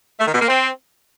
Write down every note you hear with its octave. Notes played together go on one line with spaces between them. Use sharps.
A3
D#3
B2
A#3
C4